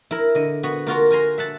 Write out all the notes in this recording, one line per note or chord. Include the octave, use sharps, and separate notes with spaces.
E4 A#4
D3 D#5
B3 F#4
A#3 F4 F#4 A#4
A#4 G#5 A#5 C6
E5 F#5 A5